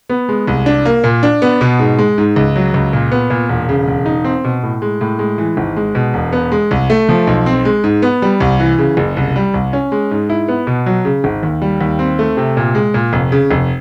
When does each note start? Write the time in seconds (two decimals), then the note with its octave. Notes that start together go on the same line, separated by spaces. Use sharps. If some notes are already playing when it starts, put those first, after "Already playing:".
0.10 B3
0.29 G#3
0.47 C2
0.66 D4
0.85 A#3
1.04 A#2
1.23 D4
1.42 B3
1.61 B2
1.79 G#2
1.98 G#3
2.18 G#2
2.36 C#2
2.56 F#3
2.74 C#2
2.93 A#2
3.12 B3
3.30 A#2
3.49 E1
3.69 C#3
3.88 E1
4.06 D#4
4.24 C4
4.44 B2
4.63 A2
4.82 G#3
5.01 A2
5.19 G#3
5.38 E3
5.57 G#1
5.76 G#3
5.95 B2
6.14 E1
6.33 B3
6.52 G#3
6.71 C2
6.90 A3
7.09 F3
7.27 B1
7.46 C4
7.65 G#3
7.84 G#2
8.02 B3
8.22 G3
8.40 C2
8.60 E3
8.78 C#3
8.97 F#1
9.17 C2
9.36 G3
9.54 C2
9.73 C#4
9.92 G#3
10.11 G#2
10.30 E4
10.48 B3
10.67 B2
10.86 F#3
11.05 C#3
11.24 G#1
11.43 D#2
11.62 G3
11.81 D#2
11.99 C4
12.19 A3
12.37 C3
12.57 A#2
12.75 G#3
12.94 A#2
13.13 F1
13.32 C#3
13.51 F1